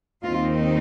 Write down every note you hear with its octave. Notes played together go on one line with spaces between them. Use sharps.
D#2 D#3 C4 D#4 F4